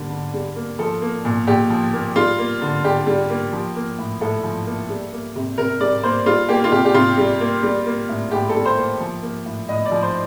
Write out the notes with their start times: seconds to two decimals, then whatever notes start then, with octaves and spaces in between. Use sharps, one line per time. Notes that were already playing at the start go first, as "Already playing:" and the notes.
Already playing: D3 G3 A#3
0.10 D3
0.34 G3
0.56 A#3
0.79 F3 A4
1.02 A#3
1.25 A#2
1.47 A#2 G4
1.70 F3
1.93 A#3
2.16 G3 F4
2.38 A#3
2.61 D3
2.84 D3 G4
3.07 G3
3.30 A#3
3.53 F3
3.76 A#3
3.98 A2
4.21 A2 A4
4.44 F3
4.66 A#3
4.89 G3
5.12 A#3
5.36 C3
5.58 C3 A#4
5.80 G3 D5
6.03 A#3 C5
6.26 G3 F4
6.48 A#3 G4
6.64 F4
6.72 C3 G4
6.85 G4
6.94 C3 F4
7.17 G3
7.40 A#3
7.63 G3
7.86 A#3
8.09 A2
8.31 A2 G4
8.49 A4
8.54 G3
8.66 C5
8.77 A#3
9.00 F3
9.22 A#3
9.46 A2
9.69 A2 D#5
9.86 D5
9.91 F3
10.03 C5